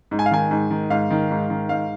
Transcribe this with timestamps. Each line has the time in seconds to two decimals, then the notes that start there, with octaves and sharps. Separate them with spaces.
0.11 G#2
0.19 G#5
0.26 F5
0.31 D#3 G#5
0.51 G#2
0.70 D#3
0.90 G#2 F5
1.10 D#3
1.31 G#2
1.50 D#3
1.69 G#2 F5